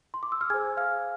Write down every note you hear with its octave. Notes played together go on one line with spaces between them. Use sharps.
C6
D6
E6
F6
G#4 C5 G#5 G#6
F5 F6